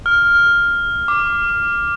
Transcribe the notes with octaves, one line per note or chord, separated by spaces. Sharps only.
F6
D6